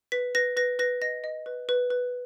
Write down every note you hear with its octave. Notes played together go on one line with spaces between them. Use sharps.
B4 B6
B4 A#6
B4 A#6
B4 A#6
D#5 A#6
D#5
B4
B4
B4